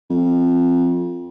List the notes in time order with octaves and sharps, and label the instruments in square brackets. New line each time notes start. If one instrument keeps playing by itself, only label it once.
[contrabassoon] F2